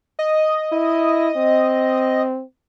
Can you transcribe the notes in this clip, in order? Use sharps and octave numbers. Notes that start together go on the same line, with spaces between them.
D#5
E4
C4